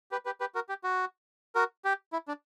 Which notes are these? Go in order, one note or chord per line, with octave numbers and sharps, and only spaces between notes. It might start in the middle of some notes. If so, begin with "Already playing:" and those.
G4 B4
G4 B4
G4 B4
F#4 A#4
G4
F#4
F#4 A#4
G4
E4
D4